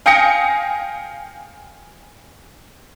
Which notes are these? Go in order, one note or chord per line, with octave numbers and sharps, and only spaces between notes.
F5 G5 G#5 D#6 A#6 C#7